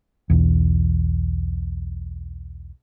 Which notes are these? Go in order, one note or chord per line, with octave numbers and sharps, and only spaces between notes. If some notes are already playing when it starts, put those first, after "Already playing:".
B1 E2